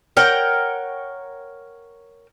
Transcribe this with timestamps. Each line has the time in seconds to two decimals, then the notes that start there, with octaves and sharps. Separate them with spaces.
0.17 A#4 C#5 F#5 G5